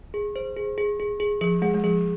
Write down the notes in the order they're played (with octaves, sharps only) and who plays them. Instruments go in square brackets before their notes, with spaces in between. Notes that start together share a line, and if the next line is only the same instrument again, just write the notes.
[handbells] G#4
C5
G#4
G#4
G#4
G#4
[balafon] F3 [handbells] G#4
[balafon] G#3 [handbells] G#4
[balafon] G#3
[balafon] F3 [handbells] G#4